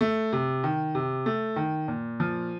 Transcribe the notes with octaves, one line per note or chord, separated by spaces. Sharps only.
A3
C3
D#3
C3
A3
D#3
A#2
F3